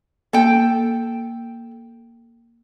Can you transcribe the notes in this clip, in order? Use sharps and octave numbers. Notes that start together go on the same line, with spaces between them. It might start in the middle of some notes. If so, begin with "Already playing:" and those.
A#3 A4 G5